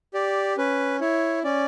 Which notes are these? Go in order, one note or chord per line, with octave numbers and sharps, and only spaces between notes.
G4 D5
C#4 B4
E4 C#5
C#4 D5